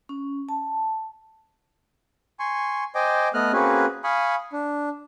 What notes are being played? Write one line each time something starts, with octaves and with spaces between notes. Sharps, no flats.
C#4
A5
G#5 C6 C#6
C5 D#5 G5 G#5 D6
A3 B3 D#5 F6 F#6
A#3 C4 C#4 F#4 G#4 B4
F5 G#5 B5 C#6 D#6
D4